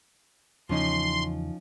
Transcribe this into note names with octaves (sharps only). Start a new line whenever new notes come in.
E2 C#3 E3 F3 C#4 D#4 C6